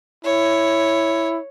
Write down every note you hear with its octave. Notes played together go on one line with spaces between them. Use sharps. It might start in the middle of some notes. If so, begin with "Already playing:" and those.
E4 C#5